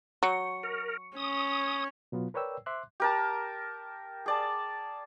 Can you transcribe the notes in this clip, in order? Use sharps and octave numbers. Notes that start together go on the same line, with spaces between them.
F#3 C#6 C#7
A#4
C#4 D#6
B2 F#3 B3 F4
A#4 B4 C#5 D5 G5 E6
C5 E5 C6 D6 F#6
G4 A#4 A5
G#4 D5 A5